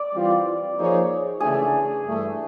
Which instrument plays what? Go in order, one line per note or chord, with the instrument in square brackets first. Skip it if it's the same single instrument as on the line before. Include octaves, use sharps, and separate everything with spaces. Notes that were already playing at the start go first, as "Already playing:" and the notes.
Already playing: [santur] D5
[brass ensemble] E3 G3 C4 F4
F3 A#3 D#4 G#4 C#5
[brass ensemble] C#3 E3 A3 D4 [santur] G#4
[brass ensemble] G2 E3 A3